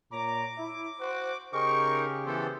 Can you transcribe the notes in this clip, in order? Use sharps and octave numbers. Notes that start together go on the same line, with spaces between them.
A#2 C#5 A#5 D6
E4
F#4 C5
C#3 D#4 G4 G#4 A#4 C#6
E3 B3 A4 C5